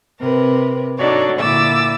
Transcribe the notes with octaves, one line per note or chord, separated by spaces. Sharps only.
C3 A#4 B4
D4 D#4 F#4 A4 C#5 D5
A#2 D3 E4 D6 E6 A6